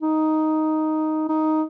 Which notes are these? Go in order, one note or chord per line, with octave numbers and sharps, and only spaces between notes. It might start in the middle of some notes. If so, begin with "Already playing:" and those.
D#4
D#4